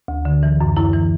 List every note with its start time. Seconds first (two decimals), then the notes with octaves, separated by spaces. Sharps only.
0.08 D2
0.25 D3
0.43 E3
0.61 F#2
0.77 F#2 E4
0.93 E3